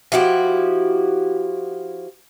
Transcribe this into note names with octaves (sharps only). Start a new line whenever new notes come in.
F3 E4 F#4 G4